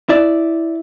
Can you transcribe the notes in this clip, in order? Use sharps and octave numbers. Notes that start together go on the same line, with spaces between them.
E4 D5